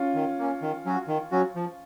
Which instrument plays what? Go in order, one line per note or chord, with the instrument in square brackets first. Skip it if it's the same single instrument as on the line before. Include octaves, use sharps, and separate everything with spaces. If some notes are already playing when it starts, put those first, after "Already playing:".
Already playing: [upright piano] C#4 F4
[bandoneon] D#3
A#3 C#4
D#3
F#3 C#4 F#4
D#3
F#3 C#4 F#4
F3